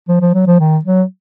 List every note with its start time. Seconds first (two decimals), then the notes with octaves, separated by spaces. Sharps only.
0.08 F3
0.21 F3
0.34 F#3
0.47 F3
0.60 D#3
0.85 F#3